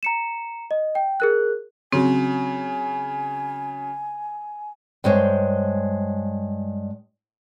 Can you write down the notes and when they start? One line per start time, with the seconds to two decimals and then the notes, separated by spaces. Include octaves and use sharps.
0.03 A#5 C#7 E7
0.71 D#5
0.95 G5
1.20 G#4 A#4 F#6
1.92 C#3 F#3 C4 G#5
5.04 G2 G#3 C5 C#5